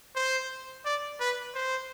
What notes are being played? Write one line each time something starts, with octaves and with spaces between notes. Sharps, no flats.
C5
D5
B4
C5